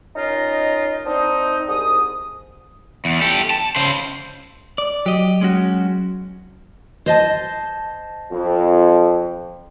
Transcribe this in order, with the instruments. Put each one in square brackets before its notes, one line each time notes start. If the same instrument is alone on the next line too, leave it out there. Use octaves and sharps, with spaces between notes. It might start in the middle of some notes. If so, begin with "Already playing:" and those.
[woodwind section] C#4 D#4 F4 A#4 D#5
C4 D4 D#4
C2 G#2 D#6
[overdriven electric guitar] E2
G4 A4
A5
C#3 C5
[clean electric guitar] D5
[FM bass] F#3 [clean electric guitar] G4 D#5
[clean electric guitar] G#3 C#4 F#4
[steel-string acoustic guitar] C5 D#5 A5
[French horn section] F2